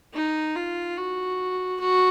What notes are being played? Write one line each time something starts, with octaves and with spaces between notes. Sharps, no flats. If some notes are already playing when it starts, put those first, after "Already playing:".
D#4
F4
F#4
F#4